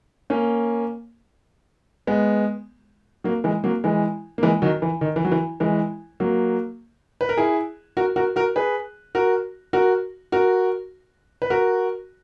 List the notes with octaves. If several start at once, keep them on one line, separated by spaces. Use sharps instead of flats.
A#3 C#4
G#3 B3
F#3 A#3
E3 G#3
F#3 A#3
E3 G#3
A#3
E3 G#3
D#3 F#3
E3
D#3
E3
F#3
E3
E3 G#3
F#3 A#3
B4
A#4
E4 G#4
F#4 A#4
F#4 A#4
F#4 A#4
G#4 B4
F#4 A#4
F#4 A#4
F#4 A#4
B4
F#4 A#4